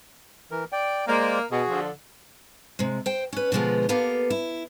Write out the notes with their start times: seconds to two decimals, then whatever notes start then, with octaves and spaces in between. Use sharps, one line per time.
0.51 E3 A#4
0.72 D5 G5
1.08 G#3 A#3 C5 D5
1.52 B2 F#4 G#4
1.69 D3 F3
2.79 C3 G#3
3.06 C5 G5
3.33 C#4 B4
3.52 B2 D3 F3 G#3 B3 F4
3.89 A#3 B3 G4 A4 F5
4.30 E4